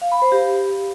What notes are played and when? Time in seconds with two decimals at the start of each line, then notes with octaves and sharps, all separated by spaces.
0.02 F5
0.12 B5
0.22 C5
0.32 G4